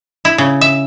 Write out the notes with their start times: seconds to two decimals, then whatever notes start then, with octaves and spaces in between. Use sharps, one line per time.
0.25 E4
0.38 C#3
0.61 E5